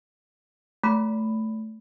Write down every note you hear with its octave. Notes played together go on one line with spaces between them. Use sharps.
A3 B5